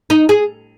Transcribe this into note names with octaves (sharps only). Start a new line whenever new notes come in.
D#4
G#4